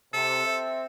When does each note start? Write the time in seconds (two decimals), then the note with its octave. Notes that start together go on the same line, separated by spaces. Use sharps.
0.14 C3 A4
0.46 C4 C5 E5